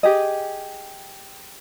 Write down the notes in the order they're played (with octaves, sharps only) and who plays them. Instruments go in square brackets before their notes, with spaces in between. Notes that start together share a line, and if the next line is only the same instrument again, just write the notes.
[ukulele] G4 G#4 D#5